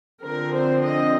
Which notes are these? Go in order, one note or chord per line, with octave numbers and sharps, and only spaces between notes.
D3 F3 C4 A#4
C5
D#5